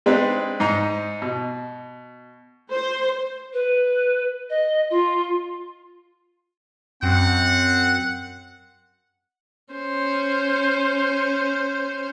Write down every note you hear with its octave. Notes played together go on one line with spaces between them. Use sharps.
G#3 C4 D4 D#4 B4 D5
G#2 D#4 D#5 A#5
B2
C5
B4
D#5
F4
F#2 C4 F#5
C#4 C5